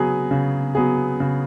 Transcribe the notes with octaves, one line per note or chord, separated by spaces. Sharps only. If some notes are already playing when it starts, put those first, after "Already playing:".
Already playing: C#3 F#3 B3 G#4
C#3
F#3 B3 G#4
C#3